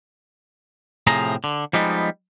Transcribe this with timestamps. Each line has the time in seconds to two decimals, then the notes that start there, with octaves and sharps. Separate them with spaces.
1.07 A2 C3 F3 G#4 A#5
1.44 D3
1.73 F3 G3 G#3 B3 D#4